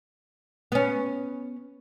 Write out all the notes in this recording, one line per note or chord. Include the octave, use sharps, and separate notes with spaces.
B3 C#4